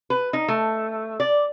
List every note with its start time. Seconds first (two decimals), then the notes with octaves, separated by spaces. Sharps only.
0.10 B4
0.33 D#4
0.48 A3
1.20 D5